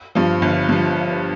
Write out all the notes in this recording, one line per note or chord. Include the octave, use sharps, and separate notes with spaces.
G2 F3
G1
G2 F3